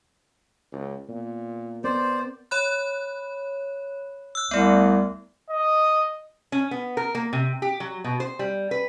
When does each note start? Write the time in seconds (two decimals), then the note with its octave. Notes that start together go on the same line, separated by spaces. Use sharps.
0.72 C#2
1.09 A#2 B3
1.84 B3 C4 A#4 C5 D5
2.51 C#5 B5 F#6
4.35 E6 F#6
4.51 C2 A3 B3
5.50 D#5
6.52 C#4
6.71 B3
6.97 A#4
7.15 A#3
7.33 C3
7.62 G4
7.80 F#3
8.04 B2
8.20 C5
8.39 G3
8.71 B4